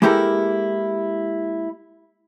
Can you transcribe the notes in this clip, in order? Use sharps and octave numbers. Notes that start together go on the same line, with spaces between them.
G#3 A#3 E4 G4 A4 A#4